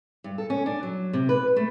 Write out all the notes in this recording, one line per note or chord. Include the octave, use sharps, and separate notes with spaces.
G2
A4
C#4
D4
F#3
C3
B4
A3